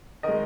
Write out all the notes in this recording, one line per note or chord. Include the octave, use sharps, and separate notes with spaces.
D#3 G#3 A#4 D#5